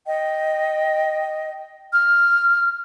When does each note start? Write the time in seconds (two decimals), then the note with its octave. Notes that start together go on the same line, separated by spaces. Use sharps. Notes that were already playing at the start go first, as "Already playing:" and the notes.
0.07 D#5 G5
1.94 F6